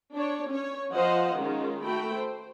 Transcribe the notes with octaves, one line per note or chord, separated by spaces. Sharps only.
D4 C#5
C#4 C#5
F3 C5 D#5 F5 F#5
D#3 G#3 C#4 F4
A3 F#4 G5 B5
C5